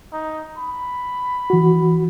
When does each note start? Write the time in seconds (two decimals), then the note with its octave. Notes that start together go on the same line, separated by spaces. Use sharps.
0.12 D#4
0.58 B5
1.50 E3 F#4